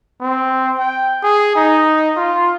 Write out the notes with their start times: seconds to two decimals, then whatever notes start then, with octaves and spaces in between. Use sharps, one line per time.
0.21 C4
0.78 G5
1.23 G#4
1.56 D#4
2.17 F4